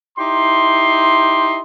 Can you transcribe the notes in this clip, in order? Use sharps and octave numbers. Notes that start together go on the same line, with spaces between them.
D#4 E4 G4 C6